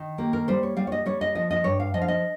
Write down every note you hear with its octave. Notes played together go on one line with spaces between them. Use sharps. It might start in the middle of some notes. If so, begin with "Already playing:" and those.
Already playing: D#3
A#3 G4
A#4
G3 C5
C#5
G3 F5
C#5
D#5
G3 C#5
D#5
F3 D#5
D#5
G2 C#5
F5
F3 D#5
F5
D#5